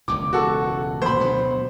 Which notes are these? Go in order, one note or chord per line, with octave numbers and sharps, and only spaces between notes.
E1 C#2 A2 D6
F#4 A4
A#2 E3 A3 C5 B5
D2 B2 F#3